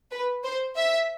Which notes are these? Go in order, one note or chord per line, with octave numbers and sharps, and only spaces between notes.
B4
C5
E5